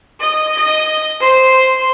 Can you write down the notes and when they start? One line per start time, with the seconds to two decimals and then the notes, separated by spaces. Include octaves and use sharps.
0.20 D#5
0.57 D#5
1.20 C5